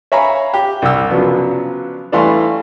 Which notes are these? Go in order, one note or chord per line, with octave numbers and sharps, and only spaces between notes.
C#5 E5 F5 G#5 A#5 B5
G4
C2 E6
C#3 F3 F#3 B3 D4
E3 G3 A3 F5 C6 C#6